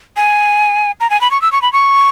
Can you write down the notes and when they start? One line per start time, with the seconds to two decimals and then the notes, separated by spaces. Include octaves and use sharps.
0.17 G#5
1.00 A#5
1.10 G#5
1.21 B5
1.31 C#6
1.42 E6
1.52 C#6
1.62 B5
1.73 C#6